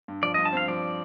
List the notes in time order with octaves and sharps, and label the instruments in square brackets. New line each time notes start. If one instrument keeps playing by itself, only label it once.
[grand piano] G2
[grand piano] F3 [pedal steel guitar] D5
[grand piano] G2 [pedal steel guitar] D#5
[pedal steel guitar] A5
[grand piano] C4 [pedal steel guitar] F5
[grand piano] F3 [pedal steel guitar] D5